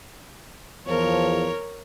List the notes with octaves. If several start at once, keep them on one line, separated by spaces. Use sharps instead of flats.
E2 F3 A#4 C#5